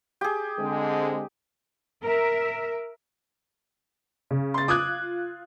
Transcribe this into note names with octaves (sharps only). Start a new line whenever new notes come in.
G4 G#4
D3 G#3 C4
A#4 E5
C#3
C6 A6
F4 D6 D#6 F#6 G#6